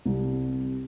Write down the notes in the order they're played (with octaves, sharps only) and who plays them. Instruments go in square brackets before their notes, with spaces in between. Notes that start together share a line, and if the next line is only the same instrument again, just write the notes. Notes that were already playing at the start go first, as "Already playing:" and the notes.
[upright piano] C2 C3 G3